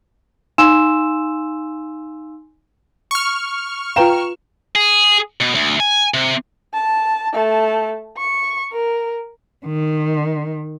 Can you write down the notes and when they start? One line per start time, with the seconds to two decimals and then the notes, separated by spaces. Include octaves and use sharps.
0.58 D#4 F5 G#5 C6 E6 E7
3.11 C#6 F6
3.96 F4 B4 F5 G5 A#5 E7
4.75 G#4
5.40 B2
5.55 D2
5.80 G#5
6.14 C3
6.74 A5
7.34 A3 A5
8.18 C#6
8.72 A#4
9.66 D#3